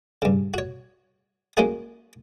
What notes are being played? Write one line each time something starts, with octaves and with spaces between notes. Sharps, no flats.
G2 C#3
F#4 C#5
G#3 A#3 C#4 D#4 F#4 G#4